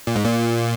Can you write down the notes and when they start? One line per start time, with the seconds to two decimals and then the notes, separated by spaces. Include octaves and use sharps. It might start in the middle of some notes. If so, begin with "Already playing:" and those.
0.07 A#2
0.16 G#2
0.24 A#2